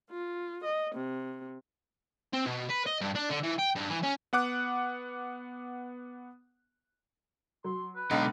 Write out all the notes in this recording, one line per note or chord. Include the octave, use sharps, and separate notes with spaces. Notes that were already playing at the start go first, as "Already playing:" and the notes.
F4
D#5
C3
C4
B2
B4
D#5
G2
D4
D3
E3
G5
G2
E3
C#4
B3 F#5 D6 F#6
F#3 C6
B4
C#2 B2 D3 D#4 D#5 F5